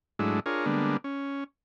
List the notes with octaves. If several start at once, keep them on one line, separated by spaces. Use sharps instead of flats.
G#2 F#3 G#3 A3 D4 E4
D4 F4 G#4 A#4 C#5
D3 G3 G#3 A#3 B3 D4
C#4